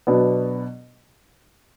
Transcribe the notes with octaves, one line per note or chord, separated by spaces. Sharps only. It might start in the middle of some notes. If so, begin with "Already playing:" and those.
B2 F#3 B3 D4